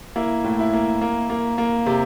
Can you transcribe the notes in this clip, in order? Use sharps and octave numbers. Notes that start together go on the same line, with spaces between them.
A#3 E4
A2
E4
A#3
A#3
A#3
A#3
C3